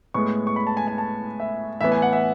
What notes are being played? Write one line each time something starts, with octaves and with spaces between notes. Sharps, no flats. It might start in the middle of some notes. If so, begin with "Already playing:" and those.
A2 G#3 B3 C#6
C#6
B5
A5
G#5
G#5
A5
E5
A2 E3 B3 E5
G#5
F#5
E5